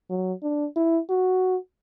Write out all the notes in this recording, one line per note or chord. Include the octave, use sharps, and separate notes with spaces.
F#3
D4
E4
F#4